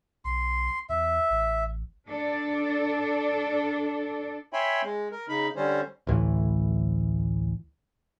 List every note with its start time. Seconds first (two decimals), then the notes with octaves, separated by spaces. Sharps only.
0.25 B1 C6
0.89 E2 E5
1.30 A1
2.08 D4 A4 D5
4.53 C#5 E5 G5 G#5 B5 C6
4.83 G#3
5.12 A#4
5.29 C#3 D#4 B5
5.56 D3 G3 C#4 C5
6.07 A1 D2 A2 E3